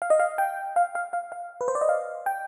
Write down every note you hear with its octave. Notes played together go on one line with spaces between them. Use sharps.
F5
D#5
F5
G5
F5
F5
F5
F5
B4
C5
D5
D#5
F5
G5